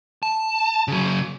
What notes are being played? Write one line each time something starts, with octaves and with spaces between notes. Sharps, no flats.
A5
C#3 F#3